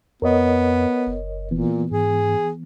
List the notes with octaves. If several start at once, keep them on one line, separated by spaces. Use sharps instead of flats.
F2 B3 A#4 C#5 D#5
F#1
A#2 E3 B3
G#2 G#4